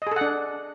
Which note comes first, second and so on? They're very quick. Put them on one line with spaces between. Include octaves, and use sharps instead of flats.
D#5 G#4 A4 F#5 D4